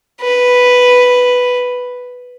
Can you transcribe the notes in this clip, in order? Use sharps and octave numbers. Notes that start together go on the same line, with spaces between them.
B4